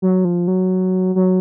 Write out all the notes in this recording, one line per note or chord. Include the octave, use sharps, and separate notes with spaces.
F#3
F3
F#3
F#3